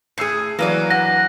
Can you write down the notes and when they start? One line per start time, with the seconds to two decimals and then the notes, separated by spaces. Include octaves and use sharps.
0.18 A2 G#4 E6 C7 C#7
0.59 E3 F#3 A#3 B4 D5
0.90 G2 F#5 A#6